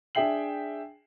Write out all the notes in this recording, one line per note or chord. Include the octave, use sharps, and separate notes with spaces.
D4 G#4 E5 G5 C7 F#7